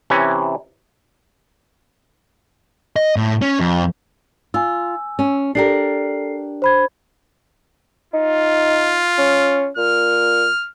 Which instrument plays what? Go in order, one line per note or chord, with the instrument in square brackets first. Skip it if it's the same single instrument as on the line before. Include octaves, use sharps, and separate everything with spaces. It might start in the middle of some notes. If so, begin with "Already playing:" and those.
[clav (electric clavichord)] C3 E3 C#4
[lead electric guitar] D#5
A2
C#4
F2
[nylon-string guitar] F4 [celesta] G#5 E6
[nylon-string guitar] C#4
[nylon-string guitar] D4 G4 A#4 [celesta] A4 C7
[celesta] C5 B5 G#6
[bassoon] D#4 [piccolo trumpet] F4
[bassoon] C#4
[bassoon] A#2 [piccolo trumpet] F6